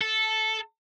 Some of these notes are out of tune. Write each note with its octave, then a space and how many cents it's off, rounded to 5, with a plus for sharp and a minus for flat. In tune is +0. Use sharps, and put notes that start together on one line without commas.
A4 -10